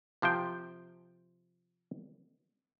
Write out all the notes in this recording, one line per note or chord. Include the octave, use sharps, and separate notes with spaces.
C3 F3 C5 G5